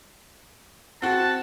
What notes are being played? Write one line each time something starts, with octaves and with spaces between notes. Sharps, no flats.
C4 F#4 F#5 A5